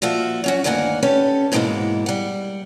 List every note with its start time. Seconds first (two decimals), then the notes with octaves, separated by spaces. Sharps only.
0.02 A#2 F3 F4 F#4 E5
0.44 F#3 C#4 F#4
0.64 D2 G2 D#3 A#3 F#5 G#5
1.03 C#4 G4 A4 B4
1.52 G#2 B2 E3 G#3 A#3 B3
2.06 G3 F#5